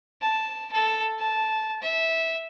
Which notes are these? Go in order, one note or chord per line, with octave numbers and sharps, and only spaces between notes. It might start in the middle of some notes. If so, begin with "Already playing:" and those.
A5
A4
A5
E5